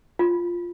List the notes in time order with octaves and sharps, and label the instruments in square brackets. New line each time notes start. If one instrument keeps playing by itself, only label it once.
[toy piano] F4